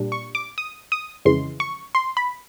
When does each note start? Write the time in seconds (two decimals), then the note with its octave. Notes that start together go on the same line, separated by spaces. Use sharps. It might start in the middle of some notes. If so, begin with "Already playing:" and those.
Already playing: A#2 G3 D4
0.12 C#6
0.35 D6
0.58 D#6
0.92 D#6
1.25 F2 C#3 E3 G#3 C6
1.60 C#6
1.95 C6
2.17 B5